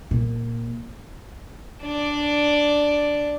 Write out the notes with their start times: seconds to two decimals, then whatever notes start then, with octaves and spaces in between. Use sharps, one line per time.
0.11 A#2
1.82 D4 D5